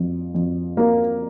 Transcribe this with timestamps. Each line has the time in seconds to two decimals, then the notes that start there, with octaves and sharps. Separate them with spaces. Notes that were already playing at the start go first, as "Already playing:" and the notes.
Already playing: F2
0.35 F2
0.77 A#3